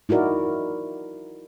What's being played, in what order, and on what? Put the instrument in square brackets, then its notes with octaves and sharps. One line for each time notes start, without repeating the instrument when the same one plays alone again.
[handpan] D#4 E4 F#4 A#4 D5